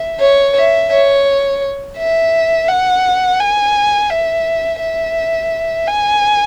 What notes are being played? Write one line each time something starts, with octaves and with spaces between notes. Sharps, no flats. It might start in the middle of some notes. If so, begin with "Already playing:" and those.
Already playing: E5
C#5
E5
C#5
E5
F#5
G#5
E5
E5
G#5